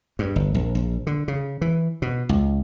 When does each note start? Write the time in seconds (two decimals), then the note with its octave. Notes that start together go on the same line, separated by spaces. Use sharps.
0.19 G2
0.36 G1
0.54 A#1
0.75 A#1
1.07 D3
1.28 C#3
1.61 E3
2.02 B2
2.29 C#2